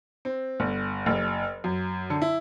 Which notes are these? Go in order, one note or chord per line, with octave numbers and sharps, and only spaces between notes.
C4
G1
F#1
F#2
D3
E4